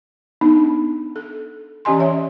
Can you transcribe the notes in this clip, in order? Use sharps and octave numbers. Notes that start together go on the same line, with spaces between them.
B3 D4 D#4
A4
E3 C#4 G4 D#5 G#5 C6
C#5 E5